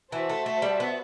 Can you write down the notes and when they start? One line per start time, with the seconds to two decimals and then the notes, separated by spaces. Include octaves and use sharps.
0.12 E3 F#4 C5 E5 A5
0.30 A3
0.46 A3
0.62 G3
0.80 B3